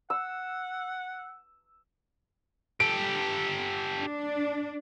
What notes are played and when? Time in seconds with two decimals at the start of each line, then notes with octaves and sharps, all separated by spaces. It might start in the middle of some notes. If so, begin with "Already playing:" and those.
0.10 F#5 E6
2.80 G4 A4 D7
4.00 D4